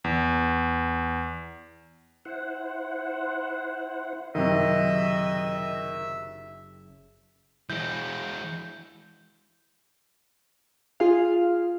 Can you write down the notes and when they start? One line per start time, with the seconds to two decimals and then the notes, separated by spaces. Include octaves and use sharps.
0.04 E2
2.25 E4 C5 F#5
4.35 F#1 C3 D#3 F#3 D#5 E5 C6
7.70 E3 G#3 G6
11.00 F4 G#4 F5